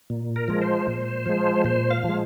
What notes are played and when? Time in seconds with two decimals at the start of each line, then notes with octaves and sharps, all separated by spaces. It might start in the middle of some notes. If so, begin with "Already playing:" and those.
0.10 A#2
0.36 A#4
0.48 F3 G#3
0.62 C5
0.88 A#2
1.26 F3 G#3
1.64 A#2 C5
1.90 F5
2.04 F3 G#3